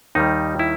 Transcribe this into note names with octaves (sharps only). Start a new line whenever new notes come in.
D#2 D#3 G3 D#4
E4